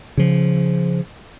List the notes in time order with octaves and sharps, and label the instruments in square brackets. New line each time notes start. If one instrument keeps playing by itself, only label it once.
[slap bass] C#3 F3